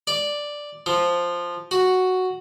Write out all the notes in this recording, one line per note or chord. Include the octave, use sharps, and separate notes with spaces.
D5
F3
F#4